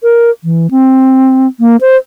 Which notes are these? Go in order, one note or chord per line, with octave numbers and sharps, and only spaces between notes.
A#4
E3
C4
A#3
C5